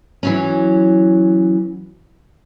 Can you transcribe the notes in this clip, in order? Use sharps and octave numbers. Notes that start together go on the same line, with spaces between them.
E3 F#3 C#4